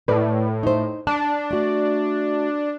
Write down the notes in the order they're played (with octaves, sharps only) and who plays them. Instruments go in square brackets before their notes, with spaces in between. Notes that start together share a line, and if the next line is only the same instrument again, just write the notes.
[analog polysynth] A2 [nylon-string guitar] B4 D5
[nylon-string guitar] D#4 C5
[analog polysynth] D4 [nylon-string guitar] A5
[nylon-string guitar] A3 F#4